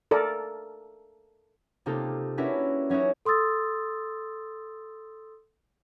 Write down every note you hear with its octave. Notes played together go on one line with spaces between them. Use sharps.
A4 A#4 D5
C3 A#3 D#4 F4 G4 A4
C#4 D4 E4 F#4 A#4 B4
F#3 C#4 D#4 E4 F#4
A4 C6 D#6 E6 A6